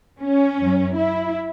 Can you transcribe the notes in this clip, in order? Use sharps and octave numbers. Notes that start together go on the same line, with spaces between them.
C#4
F#2 F#3
E4